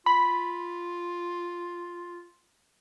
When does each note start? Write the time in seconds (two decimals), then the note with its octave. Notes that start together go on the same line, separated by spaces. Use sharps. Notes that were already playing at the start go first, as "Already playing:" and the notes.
0.06 F4 B5